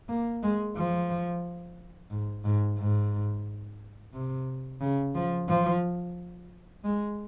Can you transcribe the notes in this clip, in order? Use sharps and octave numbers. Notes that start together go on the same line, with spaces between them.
A#3
G#3
F3
G#2
G#2
G#2
C3
C#3
F3
F3
G#3